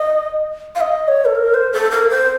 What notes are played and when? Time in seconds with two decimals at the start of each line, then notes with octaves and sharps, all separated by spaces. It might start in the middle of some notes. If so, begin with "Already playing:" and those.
Already playing: D#5
0.75 F5
0.81 D#5
1.08 C#5
1.25 A4
1.35 A#4
1.54 C5
1.73 A4
1.91 A#4
2.09 C5